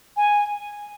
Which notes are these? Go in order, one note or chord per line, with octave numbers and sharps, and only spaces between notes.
G#5